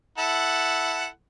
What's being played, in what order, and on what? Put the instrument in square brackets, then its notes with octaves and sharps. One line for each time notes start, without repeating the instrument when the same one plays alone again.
[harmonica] E4 A4 F#5